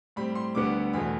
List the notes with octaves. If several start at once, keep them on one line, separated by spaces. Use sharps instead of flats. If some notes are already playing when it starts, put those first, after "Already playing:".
A2 G3 C4 B5
C6
D2 D3 G3 B3 D6
E2 B2 A3 B5